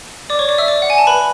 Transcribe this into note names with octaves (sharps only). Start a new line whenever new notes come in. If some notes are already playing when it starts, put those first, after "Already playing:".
D5 D6
C#5 C#6
D5 D6
E5 E6
D5 D6
F#5
G#5
A5
B4 B5